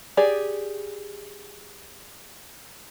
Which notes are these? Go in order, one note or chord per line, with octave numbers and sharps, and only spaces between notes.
G4 G#4 D5